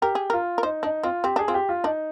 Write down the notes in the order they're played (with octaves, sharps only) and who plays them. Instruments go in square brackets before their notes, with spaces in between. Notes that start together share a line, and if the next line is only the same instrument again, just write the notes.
[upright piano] G4 [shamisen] A#4
[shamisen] G#4
[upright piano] F4 [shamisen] A#4
[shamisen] A#4
[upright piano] D#4 [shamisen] C5
[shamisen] D4 [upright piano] D#4
[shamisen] C4 [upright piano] F4
[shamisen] C4 [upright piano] G4
[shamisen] D4 [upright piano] G#4
[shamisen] C4 [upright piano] F4
[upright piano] G4
F4
[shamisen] D4 [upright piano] D#4